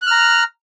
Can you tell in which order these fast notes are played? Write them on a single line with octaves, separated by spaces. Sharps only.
F#6 F6 A#5